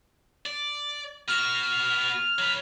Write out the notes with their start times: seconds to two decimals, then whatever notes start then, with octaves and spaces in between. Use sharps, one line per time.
0.46 D5
1.28 B3 F#4 F6
2.38 F#3 B4